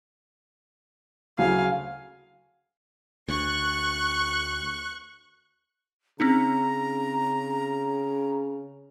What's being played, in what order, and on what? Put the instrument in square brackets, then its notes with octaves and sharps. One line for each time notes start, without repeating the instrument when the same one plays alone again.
[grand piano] D2 C#3 F#3 [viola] F5 G#5
[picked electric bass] D2 [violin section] C#6 F#6
[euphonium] C#3 [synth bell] C4 C#4 D#4 [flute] A#5